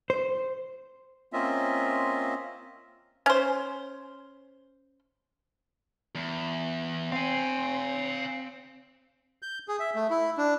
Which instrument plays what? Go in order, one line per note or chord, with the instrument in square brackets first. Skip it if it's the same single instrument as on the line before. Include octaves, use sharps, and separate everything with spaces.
[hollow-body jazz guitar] C5
[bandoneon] A#3 C4 C#4 F4 D#5 E5
[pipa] C#4 C5
[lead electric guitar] E2
[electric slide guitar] C4 [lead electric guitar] F5 G#5
[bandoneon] G6
G#4
E5
A3
E4
D4